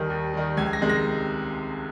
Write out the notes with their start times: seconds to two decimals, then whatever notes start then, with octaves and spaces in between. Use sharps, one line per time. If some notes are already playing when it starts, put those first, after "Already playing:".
Already playing: D#2 D#3 G3
0.10 D#2
0.34 D#3 G3
0.57 C#2 G#6
0.73 A#6
0.81 C3 D#3 G#3
0.89 A#6